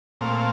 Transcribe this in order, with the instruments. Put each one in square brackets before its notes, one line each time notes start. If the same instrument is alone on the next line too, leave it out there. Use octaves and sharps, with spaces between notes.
[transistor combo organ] A#2 A3 C4 F5